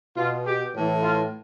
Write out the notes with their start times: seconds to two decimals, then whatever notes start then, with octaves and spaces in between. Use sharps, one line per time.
0.17 B2 F4
0.45 G4
0.74 A2 E3
1.02 F4